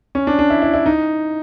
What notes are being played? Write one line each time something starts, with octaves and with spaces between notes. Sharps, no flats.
C#4
D4
D4
E4
E4
E4
D#4